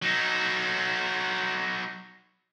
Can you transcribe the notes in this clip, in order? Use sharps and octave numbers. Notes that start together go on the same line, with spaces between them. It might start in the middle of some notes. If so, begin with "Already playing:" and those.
F#3 D#4